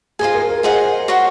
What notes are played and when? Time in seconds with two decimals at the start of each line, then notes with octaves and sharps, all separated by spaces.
0.19 F4 G#4 C5 D#5 G#5
0.34 A#4
0.49 A#4
0.63 F4 G#4 C5 D#5 F#5
1.08 F#4 C#5 F#5 C6